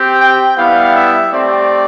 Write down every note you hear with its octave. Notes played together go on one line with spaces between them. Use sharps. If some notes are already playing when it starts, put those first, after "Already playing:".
Already playing: C4 G4
G5
G3 B3 E4 F5
E5
A3 C4 G4 D5